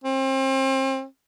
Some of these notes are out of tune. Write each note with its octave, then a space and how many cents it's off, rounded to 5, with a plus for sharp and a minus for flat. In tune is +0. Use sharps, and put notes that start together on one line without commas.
C4 +35